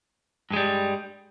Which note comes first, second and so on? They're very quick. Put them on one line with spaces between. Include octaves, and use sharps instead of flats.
G2 G#3 G3